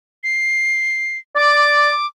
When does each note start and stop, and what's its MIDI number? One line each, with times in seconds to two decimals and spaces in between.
0.24 1.18 96
1.36 1.90 74
1.36 2.06 86